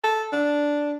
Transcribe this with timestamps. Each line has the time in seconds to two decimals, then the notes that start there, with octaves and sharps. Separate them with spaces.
0.04 A4
0.32 D4